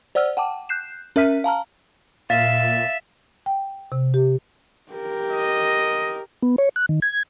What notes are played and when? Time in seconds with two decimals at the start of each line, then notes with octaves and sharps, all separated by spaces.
0.15 C5 D5 F#5 E6 F6
0.37 F#5 G5 A5 D6
0.69 F#6 G6 C7 E7
1.16 C#4 A#4 E5 F6 B6 D#7
1.44 F5 A5 A#5 F6
2.30 A#2 E5 F5 A6 B6
3.46 G5
3.92 C3
4.14 G4
4.92 G4 A#4
5.30 D#5
6.43 B3
6.58 C#5
6.76 F#6
6.89 D#3
7.02 G#6